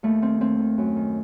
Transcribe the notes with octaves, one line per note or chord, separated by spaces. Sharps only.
D#2 A3
D#3 C4
D#2 C4
D#3
F#2
D#3